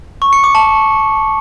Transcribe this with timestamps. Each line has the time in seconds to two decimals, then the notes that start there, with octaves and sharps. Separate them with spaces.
0.22 C#6
0.33 C#7
0.44 D6
0.55 A5